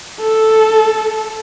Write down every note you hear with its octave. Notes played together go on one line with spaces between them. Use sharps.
A4